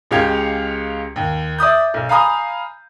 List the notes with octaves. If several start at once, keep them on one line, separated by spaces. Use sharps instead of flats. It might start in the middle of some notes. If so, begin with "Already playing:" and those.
C#2 G#3 G4 F5 G#6
D#2
D5 E5 D#6 G6
B1
F5 G#5 A#5 B5 D#6